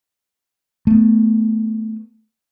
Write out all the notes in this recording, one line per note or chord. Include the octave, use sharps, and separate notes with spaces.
A3 B3